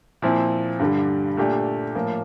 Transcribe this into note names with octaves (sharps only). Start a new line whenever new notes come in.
A#2 F3 C4 E4
G2 D3 G3
A#2 A3 D4 G4
A2 F3 A#3